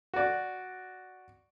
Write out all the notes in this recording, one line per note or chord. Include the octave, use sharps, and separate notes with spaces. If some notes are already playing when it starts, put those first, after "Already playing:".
F#4 D5